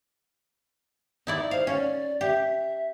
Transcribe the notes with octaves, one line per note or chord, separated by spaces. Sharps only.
D#4 E4 D5
C5 F5
C#4 D5
G4 E5